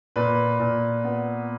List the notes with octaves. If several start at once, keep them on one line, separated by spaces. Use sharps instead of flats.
A#2 B4
A#2
B3